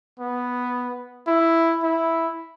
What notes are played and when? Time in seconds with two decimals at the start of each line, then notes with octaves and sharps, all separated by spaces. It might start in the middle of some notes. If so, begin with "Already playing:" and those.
0.20 B3
1.27 E4
1.83 E4